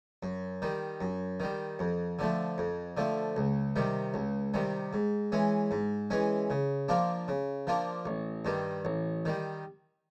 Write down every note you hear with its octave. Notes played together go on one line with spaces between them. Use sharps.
F#2
D#3 G3
F#2
D#3 G3
F2
D3 F3 A3
F2
D3 F3 A3
C#2
C3 D#3 G3
C#2
C3 D#3 G3
G#2
E3 G#3 C#4
G#2
E3 G#3 C#4
C#3
F3 A#3 D4 F4
C#3
F3 A#3 D4 F4
A1
G2 D#3 G3
A1
D#3 G3